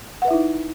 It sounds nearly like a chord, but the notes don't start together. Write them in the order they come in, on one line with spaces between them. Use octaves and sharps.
F#5 B4 E5 E4 D#4